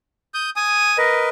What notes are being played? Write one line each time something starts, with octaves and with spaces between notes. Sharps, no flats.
D#6 G6
G#5 D#6
A#4 B4 D#5